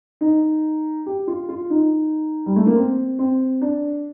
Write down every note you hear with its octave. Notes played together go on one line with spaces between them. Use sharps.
D#4
G4
F4
F4
D#4
G3
A3
A#3
C4
C4
D4